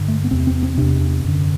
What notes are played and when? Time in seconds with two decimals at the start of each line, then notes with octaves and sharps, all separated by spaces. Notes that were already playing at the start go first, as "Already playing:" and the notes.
Already playing: G2 D3
0.08 A3
0.24 B3
0.31 E2 C3 C4
0.47 C4
0.63 C4
0.78 E2 C3 D4
1.25 F#2 D3